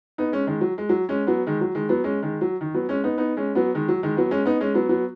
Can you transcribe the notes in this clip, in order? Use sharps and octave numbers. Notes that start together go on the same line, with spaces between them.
B3 D#4
G#3 C#4
D#3 G#3
F#3
G#3
F#3
G#3 C#4
F#3 B3
D#3 G#3
F#3
D#3 G#3
F#3 B3
G#3 C#4
D#3 G#3
F#3
D#3
F#3 B3
G#3 C#4
B3 D#4
B3 D#4
G#3 C#4
F#3 B3
D#3 G#3
F#3
D#3 G#3
F#3 B3
G#3 C#4
B3 D#4
G#3 C#4
F#3 B3
F#3 B3